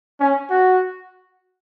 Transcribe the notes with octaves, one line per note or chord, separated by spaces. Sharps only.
C#4
F#4